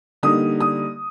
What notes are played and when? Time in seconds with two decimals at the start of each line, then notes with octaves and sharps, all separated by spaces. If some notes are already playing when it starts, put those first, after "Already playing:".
0.23 D3 G3 A#3 D#4 D#6
0.61 D#6